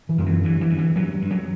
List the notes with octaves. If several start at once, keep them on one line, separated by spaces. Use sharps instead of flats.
E3
F#2
E3
G2 E3
E3
G2
E3
G2 F#3
G2
F#3